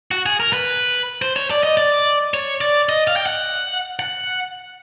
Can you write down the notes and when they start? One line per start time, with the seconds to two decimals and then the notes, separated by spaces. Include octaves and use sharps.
0.11 F#4
0.26 G#4
0.40 A#4
0.53 B4
1.22 C5
1.36 C#5
1.51 D5
1.63 D#5
1.77 D5
2.34 C#5
2.61 D5
2.89 D#5
3.07 F5
3.16 G5
3.26 F#5
3.99 F#5